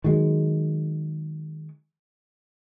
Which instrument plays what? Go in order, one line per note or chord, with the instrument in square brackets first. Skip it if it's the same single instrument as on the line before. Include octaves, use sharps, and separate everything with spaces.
[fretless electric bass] D#3 F#3 G#3